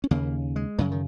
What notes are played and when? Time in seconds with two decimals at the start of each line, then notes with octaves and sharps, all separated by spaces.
0.04 C#4
0.11 D#2 C#3 A#3
0.56 G#3
0.79 F#2 C#3 F#3
0.92 D#3